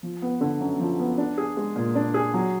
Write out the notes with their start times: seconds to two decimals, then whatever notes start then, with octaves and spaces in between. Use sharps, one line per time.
0.03 F3
0.22 B3
0.41 D3
0.61 F#2
0.80 F3
1.00 B3
1.18 D4
1.38 G#4
1.57 G#3
1.76 A#2
1.95 D4
2.14 G#4
2.34 F#3